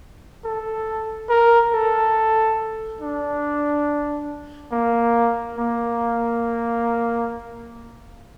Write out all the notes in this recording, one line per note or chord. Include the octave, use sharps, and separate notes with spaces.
A4
A#4
A4
D4
A#3
A#3